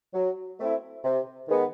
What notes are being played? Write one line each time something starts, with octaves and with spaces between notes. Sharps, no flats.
F#3
A3 C4 E4
C3
D#3 G#3 B3